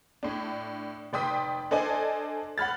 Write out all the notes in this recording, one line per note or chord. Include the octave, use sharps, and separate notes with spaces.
A2 D4
F1 D5 G5 C6 D#6 B6
D4 A4 C5 D5 D#5 G#5
F#5 B5 F6 A6